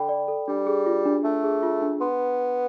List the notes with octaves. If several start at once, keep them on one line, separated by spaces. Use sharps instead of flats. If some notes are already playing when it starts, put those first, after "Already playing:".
Already playing: D3 A4 G5 B5
D5
A4
G3 D4
G#4
F4
D4
A3 D4
G#4
F4
D4
B3 C6